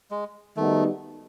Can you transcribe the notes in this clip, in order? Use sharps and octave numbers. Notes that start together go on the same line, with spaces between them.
G#3
D#3 G3 A3 B3 D#4 F#4